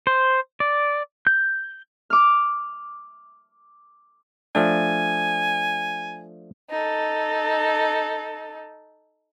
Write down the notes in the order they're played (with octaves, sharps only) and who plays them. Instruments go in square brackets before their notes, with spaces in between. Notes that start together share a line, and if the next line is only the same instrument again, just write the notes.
[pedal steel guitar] C5
D5
G6
[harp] D6 F6
[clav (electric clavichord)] F3 A3 D4 [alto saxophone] G#5
[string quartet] D#4 A4